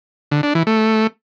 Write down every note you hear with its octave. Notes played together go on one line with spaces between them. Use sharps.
D3
D4
E3
A3